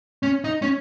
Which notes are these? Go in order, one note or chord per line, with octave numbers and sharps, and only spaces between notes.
C#4
D#4
C#4